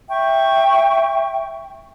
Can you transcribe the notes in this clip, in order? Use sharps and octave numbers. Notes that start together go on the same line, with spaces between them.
E5 G5 C#6